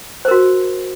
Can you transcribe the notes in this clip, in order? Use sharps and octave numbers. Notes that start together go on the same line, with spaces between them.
F#4 A#4 C5